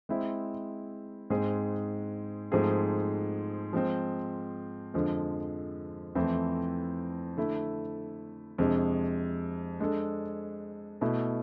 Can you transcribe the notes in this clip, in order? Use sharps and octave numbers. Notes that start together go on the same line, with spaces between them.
G#3 C4 E4
G#2 G#3 C4 G#4
G#2 F3 A3 C4 G#4
F3 G#3 C4
F2 D3 F3 G#3
F2 E3 A3 C4 E4
D3 A3 E4
F2 C3 G#3 D4 G#4
G#3 D4 A4
B2 A3 E4